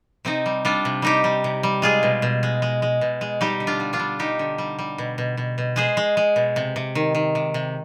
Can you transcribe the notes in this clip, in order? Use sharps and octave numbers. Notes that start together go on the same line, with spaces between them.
C3 C4 D#4
G3
G3 D4 F4
C3
G3 D#4 G4
G3
C3
G3
G#3 F4 G#4
B2
B2
G#3
G#3
G#3
B2
G#3
G3 D#4 G4
D3
D4 F4
G3
D4 F4
G3
G3 D#4 G4
D3
G3
G3
B2
B2
B2
B2
G#3 G#4 C5
G#3
G#3
B2
C3
C3
D#3
D#3
C3
C3